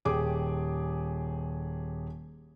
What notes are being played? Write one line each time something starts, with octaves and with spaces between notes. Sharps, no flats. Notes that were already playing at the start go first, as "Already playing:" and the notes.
D#1 G4 G#4 D6